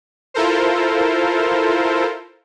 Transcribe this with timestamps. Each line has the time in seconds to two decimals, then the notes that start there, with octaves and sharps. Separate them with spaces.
0.34 E4 F4 A4 A#4 C5